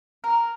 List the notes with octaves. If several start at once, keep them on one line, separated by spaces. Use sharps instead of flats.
A#4